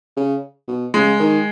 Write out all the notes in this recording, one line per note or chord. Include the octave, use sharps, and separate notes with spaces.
C#3
B2
C#3 G#3
D#3